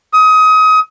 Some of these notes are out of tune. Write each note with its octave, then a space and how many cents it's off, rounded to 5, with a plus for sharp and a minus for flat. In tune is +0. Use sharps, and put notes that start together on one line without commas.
D#6 +25